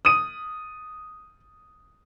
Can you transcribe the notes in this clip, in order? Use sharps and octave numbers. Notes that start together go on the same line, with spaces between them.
D#6 D#7